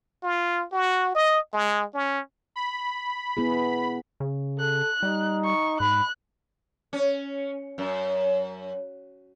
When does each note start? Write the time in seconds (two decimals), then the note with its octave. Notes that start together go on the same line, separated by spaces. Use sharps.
0.23 F4
0.72 F#4
1.15 D#5
1.53 G#3
1.94 C#4
2.56 B5
3.37 B3 E4 G#4
4.20 C#3
4.60 A4 F#6
5.03 G3 D#4
5.45 C#6
5.80 G#2 B5 F#6
6.93 C#4
7.78 F#2